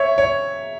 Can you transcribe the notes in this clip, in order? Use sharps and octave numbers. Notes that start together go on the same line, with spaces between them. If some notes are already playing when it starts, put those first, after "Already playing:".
Already playing: C#5 E5
C#5